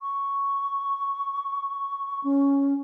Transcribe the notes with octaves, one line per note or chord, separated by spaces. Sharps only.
C#6
C#4